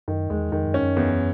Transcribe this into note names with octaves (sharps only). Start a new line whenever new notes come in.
F#2 D#3
E2 G#3
F2 D#3
F#2
C#4
F#2
E2